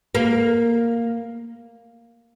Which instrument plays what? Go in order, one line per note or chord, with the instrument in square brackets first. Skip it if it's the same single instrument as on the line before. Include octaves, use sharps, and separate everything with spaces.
[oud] A#3